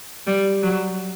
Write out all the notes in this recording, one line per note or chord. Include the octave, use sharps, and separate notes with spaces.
G3
F#3